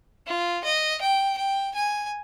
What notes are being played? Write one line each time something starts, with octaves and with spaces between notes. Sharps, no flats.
F4
D#5
G5
G5
G#5